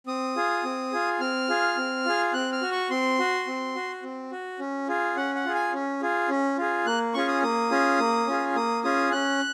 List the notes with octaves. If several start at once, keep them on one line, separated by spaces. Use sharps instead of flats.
C4 D#6
F4 G#4
C4
F4 G#4
C4 F6
F4 G#4
C4
F4 G#4
C4 F#6
F6
F#4
C#6
C4 C6
F#4
C4
F#4
C4
F#4
C#4
F4 G#4
C#4 F#5
F#5
F4 G#4
G#5
C#4
F4 G#4
C#4
F4 G#4
A#3 F#6
C#4 F4 G#4 C#6
D#6
A#3 D#6
C#4 F4 G#4
A#3
C#4 F4 G#4
A#3 D#6
C#4 F4 G#4 D#6
C#4 F#6